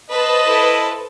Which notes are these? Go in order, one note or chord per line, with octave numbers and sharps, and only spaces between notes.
B4 C5 D#5 A5
E4 A4